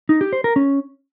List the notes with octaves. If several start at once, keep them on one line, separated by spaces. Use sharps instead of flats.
D#4
G4
C5
A#4
C#4